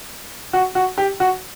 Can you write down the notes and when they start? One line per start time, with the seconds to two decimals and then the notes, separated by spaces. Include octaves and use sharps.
0.53 F#4
0.75 F#4
0.98 G4
1.20 F#4